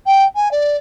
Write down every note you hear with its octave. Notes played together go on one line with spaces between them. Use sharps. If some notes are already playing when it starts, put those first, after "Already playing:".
G5
G#5
D5